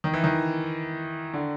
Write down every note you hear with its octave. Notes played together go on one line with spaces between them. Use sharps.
D#3
E3
D#3
D3